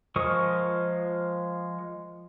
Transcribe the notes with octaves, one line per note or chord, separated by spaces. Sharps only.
F3 G#3 A#4 C#6 D#6